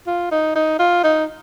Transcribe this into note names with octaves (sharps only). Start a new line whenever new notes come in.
F4
D#4
D#4
F4
D#4